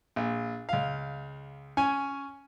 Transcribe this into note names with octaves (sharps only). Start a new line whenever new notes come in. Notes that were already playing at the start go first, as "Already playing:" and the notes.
A#1
C#2 F5
C#4 G#5